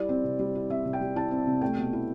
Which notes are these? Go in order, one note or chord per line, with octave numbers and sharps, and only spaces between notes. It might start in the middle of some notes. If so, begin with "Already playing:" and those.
Already playing: G3 E4 D5
C4
C3
G3
E4
C4 E5
C3
G5
G3
E4 A5
C4
C3
A3 G5
B2
E4